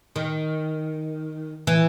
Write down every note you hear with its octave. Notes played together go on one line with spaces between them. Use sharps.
D#3
E3